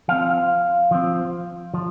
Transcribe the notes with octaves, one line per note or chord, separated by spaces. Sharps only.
F3 C4 F5
F3 C4
F3